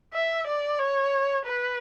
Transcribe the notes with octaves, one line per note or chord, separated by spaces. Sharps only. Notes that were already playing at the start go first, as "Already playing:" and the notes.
E5
D5
C#5
B4